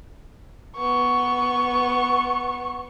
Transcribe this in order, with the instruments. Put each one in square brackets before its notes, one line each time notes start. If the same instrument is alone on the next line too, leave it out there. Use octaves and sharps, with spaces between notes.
[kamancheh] B3 C#6